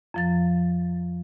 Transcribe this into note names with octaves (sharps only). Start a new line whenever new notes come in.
F2 F3 A6